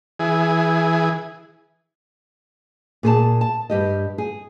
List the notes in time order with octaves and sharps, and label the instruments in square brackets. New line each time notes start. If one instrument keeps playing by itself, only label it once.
[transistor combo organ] E3 G#4
[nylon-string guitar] A#2 G#4 C5 A5
A5
G2 G4 D#5
G#4